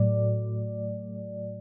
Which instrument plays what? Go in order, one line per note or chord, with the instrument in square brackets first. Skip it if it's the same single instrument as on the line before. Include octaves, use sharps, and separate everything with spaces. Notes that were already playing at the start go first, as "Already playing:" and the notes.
Already playing: [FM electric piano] A2 F#3 A3 D5